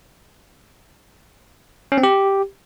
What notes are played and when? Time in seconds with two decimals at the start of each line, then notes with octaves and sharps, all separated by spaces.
1.92 C#4
1.98 C4
2.03 G4